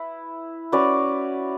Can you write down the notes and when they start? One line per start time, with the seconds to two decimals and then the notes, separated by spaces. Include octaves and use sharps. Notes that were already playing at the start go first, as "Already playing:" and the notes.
Already playing: E4 B4 E5
0.72 C#4 F#4 B4 D5